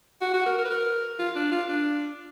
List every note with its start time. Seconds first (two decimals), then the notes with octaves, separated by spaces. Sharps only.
0.22 F#4
0.34 F#4
0.46 A#4
0.59 A#4
0.65 B4
0.70 A#4
1.19 F4
1.36 D4
1.52 F4
1.69 D4